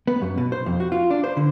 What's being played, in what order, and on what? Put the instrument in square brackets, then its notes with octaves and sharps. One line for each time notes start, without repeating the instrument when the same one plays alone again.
[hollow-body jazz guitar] B3
F#2
B2
C5
F2
F#4
F4
D4
C5
D3